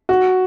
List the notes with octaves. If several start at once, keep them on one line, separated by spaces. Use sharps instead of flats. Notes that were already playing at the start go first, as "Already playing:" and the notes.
F#4